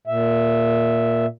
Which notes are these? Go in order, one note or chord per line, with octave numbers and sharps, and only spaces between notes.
A#2 E5